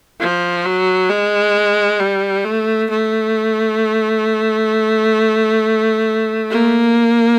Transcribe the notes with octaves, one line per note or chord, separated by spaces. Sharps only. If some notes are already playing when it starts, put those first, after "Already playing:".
F3
F#3
G#3
G3
A3
A3
A#3